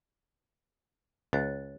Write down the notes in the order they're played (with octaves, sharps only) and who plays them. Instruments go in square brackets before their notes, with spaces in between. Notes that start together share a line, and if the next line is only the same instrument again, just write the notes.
[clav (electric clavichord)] C#2 [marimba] C#5 F#6 A6